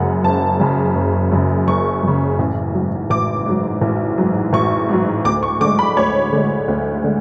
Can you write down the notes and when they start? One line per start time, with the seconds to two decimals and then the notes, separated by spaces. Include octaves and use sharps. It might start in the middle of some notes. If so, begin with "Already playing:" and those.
Already playing: F#1 F#2 C#3 F#5
0.24 F#1 A5
0.60 F#2 C#3
0.95 F#1
1.32 F#2 C#3
1.67 F#1 C#6
2.03 F#2 C#3
2.39 A1
2.75 G#2 F#3
3.10 A1 D6
3.46 G#2 F#3
3.81 A1
4.18 G#2 F#3
4.53 A1 C#6
4.89 G#2 F#3
5.25 D2 D6
5.43 C#6
5.61 D3 D6
5.65 G#3
5.79 B5
5.97 D2 C#5
6.33 D3 G#3
6.68 D2
7.04 D3 G#3